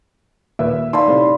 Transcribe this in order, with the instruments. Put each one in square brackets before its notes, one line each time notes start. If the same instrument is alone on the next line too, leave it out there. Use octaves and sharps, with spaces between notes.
[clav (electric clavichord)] D#2 A#2 [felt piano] B4 E5
[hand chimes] D#4 D5 B5 [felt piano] F5 A5 C6
[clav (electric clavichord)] A2 C3